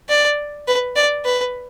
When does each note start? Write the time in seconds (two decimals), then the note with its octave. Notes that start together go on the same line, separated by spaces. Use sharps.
0.09 D5
0.68 B4
0.96 D5
1.25 B4